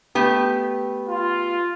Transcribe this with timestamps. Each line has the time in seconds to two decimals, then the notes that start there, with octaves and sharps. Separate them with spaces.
0.15 A3 B3 G4
1.08 F4